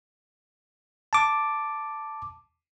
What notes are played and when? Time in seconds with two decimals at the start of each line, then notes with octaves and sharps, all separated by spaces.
1.13 A5 D6